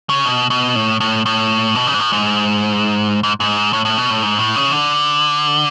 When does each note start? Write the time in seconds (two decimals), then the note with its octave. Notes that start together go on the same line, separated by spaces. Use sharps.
0.09 C#3
0.25 B2
0.50 B2
0.76 A2
1.00 A2
1.26 A2
1.75 B2
1.87 C#3
1.94 G#2
2.00 A2
2.13 G#2
3.23 G#2
3.40 G#2
3.73 A2
3.85 A2
3.98 B2
4.10 A2
4.23 G#2
4.39 A2
4.56 C#3
4.72 D3